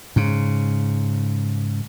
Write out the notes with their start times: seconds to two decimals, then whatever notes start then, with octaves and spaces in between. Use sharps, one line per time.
0.16 G#2 C#3